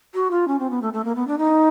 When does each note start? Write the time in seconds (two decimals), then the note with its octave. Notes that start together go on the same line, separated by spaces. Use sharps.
0.14 F#4
0.31 F4
0.48 C#4
0.59 C4
0.70 B3
0.82 A3
0.93 A3
1.05 A#3
1.16 B3
1.27 D4
1.38 D#4